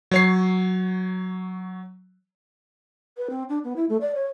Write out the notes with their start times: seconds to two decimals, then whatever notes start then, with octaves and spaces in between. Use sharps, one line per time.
0.11 F#3 C#5 C7
3.17 B4
3.30 C4
3.49 D4
3.64 B3
3.76 E4
3.89 A3
4.01 D5
4.15 C#5